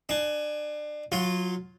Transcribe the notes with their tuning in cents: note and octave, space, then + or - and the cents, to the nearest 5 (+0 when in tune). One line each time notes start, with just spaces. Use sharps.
D4 +30 G#5 +15
F#3 -20 F4 +0